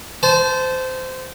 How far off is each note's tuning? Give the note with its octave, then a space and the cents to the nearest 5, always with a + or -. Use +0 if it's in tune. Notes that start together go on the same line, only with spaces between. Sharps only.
C5 -20 A5 -15